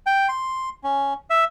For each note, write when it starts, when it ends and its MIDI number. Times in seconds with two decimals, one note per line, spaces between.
0.06 0.28 79
0.29 0.69 84
0.84 1.14 61
1.30 1.44 76